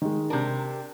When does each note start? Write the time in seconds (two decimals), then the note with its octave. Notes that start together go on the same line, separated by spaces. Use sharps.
0.02 D#3 G#3
0.30 C3 D4 A#4